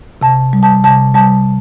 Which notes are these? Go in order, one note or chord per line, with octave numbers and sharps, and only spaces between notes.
C3 A5
G3
A5
C3 A5
G3 A5